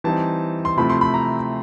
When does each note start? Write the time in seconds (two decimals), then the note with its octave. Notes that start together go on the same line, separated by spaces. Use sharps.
0.04 E3 G3 C4 D#4 A5
0.65 C6
0.77 C3 F3 A3 C4 E4 B5
0.90 C6
1.01 B5
1.14 A#5